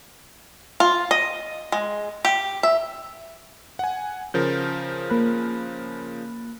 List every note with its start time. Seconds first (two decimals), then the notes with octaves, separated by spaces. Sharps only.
0.80 F4
1.11 D#5
1.72 G#3
2.25 G4
2.63 E5
3.79 F#5 G#5
4.34 C#3 F3 A#4 G6
5.10 A#3 B5 F#6